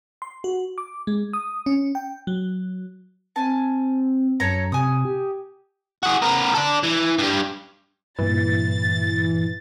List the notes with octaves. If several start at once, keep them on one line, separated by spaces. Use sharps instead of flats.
C6
F#4
D6
G#3
D#6
C#4
G5
F#3
C4 G#5 A5
F#2 A4 C#5 A#5
C3 G#5 D#6
G4
F#4 G#4
B3 A#4
A4 D5
E3
G2 G3
G2 A#2 E3 A6